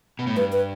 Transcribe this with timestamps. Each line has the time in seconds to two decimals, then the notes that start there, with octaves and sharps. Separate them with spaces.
0.19 B2
0.27 A2
0.36 G2 B4
0.52 B4